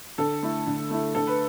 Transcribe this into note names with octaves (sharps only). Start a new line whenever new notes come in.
D3 A4
A3 E4
D3
A3 E4
D3 A4
B4